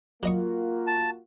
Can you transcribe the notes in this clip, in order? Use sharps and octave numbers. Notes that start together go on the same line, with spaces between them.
F#3 A#3 F4 F#4 D#5 C#6
A5